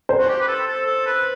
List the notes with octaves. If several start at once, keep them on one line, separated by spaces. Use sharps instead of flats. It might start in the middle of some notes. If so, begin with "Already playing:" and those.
C5
F#4
G4
B4
A4
A4
A4
B4